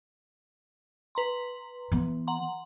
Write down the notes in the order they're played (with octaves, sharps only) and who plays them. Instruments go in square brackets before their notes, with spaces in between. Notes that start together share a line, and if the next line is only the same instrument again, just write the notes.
[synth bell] B4 A#5 C6
[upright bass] E3 B3
[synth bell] F#5 A#5 C6